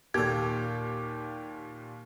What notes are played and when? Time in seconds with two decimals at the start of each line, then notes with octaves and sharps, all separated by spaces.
0.14 D#2 A#2 A#3 G4 A4 G#6